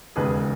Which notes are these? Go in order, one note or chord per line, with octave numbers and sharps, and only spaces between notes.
E1 D#2 C#3 G#3 G#4 B4